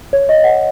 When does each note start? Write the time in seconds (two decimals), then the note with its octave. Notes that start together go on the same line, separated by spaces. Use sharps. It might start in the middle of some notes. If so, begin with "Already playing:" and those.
0.13 C#5
0.29 D#5
0.44 F#5